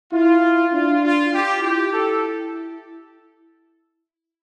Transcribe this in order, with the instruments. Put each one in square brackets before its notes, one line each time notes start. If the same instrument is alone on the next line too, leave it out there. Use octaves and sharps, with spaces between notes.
[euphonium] E4 [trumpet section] F4
[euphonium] D4 [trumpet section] F4
[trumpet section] F4
[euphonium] F4 [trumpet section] G4
[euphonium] E4 [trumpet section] G4
[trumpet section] A4